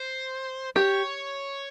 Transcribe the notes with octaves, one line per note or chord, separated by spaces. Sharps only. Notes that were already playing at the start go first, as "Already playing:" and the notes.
Already playing: C5
G4 C#5